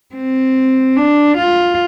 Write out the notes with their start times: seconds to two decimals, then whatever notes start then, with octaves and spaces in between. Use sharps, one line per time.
0.15 C4
0.96 D4
1.37 F4